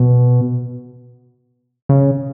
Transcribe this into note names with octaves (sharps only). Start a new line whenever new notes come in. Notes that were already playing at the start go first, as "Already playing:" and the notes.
Already playing: B2
C#3